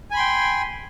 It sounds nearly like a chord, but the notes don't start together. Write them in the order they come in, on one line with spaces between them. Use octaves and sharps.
G#5 B5 C6 G5